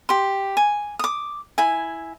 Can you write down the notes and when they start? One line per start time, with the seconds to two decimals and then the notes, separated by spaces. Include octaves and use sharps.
0.09 G4 C6
0.57 G#5
0.99 D6 D#6
1.58 E4 G#5